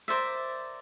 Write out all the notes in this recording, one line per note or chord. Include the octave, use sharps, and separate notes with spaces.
A#4 C5 D5 E5